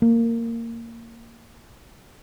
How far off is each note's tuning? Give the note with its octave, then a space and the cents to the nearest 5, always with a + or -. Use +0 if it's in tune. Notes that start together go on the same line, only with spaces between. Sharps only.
A#3 -15